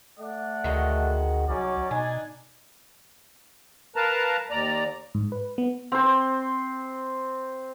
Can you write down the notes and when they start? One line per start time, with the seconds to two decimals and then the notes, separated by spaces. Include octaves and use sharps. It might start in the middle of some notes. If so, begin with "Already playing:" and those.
0.19 A3 D5 F#5
0.64 D2 D#3 G#3 F#4
1.49 C2 F#3 C#4 D#4 D5
1.91 B2 D4 D#4 G#5
3.96 A#4 B4 F5 A5 A#5
4.51 D#2 D5 A#5
5.15 G#2
5.32 B4
5.58 B3
5.92 C4 C5